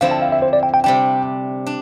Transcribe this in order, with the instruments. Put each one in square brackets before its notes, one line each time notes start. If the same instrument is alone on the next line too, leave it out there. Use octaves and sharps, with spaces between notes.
[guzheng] D3 F3 C4 E4 [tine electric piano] F5
[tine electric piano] A5
F5
E5
C5
D5
G5
G5
[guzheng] C3 G3 D4 [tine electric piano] G5
[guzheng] D4